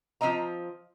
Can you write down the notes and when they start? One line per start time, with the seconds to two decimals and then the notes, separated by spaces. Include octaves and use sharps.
0.21 F3 G#3 C4 D#5 A#5